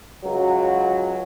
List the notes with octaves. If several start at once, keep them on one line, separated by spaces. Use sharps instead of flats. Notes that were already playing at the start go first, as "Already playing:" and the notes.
C#2 F#3